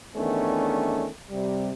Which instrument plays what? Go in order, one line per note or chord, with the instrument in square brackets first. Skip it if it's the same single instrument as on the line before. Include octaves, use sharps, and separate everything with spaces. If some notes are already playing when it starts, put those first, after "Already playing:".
[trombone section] E2 D#3 A3 B3 C#4 D4
C3 G3